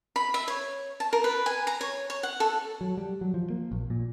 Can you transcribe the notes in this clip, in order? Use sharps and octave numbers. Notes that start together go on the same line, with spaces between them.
B5
E5
C#5
A5
A#4
B4
G#5
A#5
C#5
C#5
F#5
A4
F#3
G3
F#3
F3
A#3
A#1
A#2